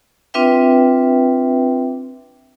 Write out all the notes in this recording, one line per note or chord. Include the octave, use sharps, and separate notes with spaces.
C4 D4 F4 B4 E5 G5